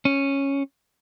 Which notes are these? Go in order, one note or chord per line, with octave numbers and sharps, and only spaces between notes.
C#4